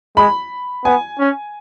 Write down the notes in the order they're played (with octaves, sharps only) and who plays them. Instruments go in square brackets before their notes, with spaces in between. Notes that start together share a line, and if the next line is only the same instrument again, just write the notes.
[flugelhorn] G#3 [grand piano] B5
[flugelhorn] B3 [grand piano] G#5
[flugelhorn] C#4